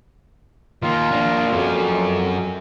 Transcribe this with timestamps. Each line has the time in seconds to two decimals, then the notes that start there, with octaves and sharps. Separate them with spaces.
0.83 D#3 A#3 F4
1.11 A#3 D4
1.53 F2 F#3 C#4